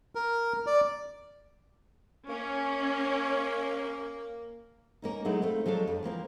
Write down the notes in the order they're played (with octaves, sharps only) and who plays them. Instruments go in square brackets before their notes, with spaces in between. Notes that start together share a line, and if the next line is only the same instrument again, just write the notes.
[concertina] A#4
D5
[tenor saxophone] A#3 [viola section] C#4
[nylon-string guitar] A#3 C#4 D#4
F#3 G#3 A3 D#4 E4
A3 A#3 C4
F3 F#3 G#3 D4 A4
F2
E3 F3 A#3 C4